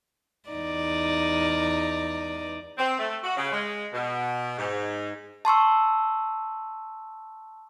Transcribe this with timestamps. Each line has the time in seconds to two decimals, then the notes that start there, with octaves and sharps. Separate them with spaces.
0.50 E2 D#4 D5
2.78 C4
2.99 A3
3.23 F#4
3.37 C#3
3.52 G#3
3.93 B2
4.58 G#2
5.45 A5 C6 C#6 E6